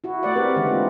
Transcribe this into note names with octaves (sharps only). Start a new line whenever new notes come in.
E4 F#4
A3 D5 F#5
C4 G4 A#4 B4
D3 E3 G#3 A#3 C4 D#4
F4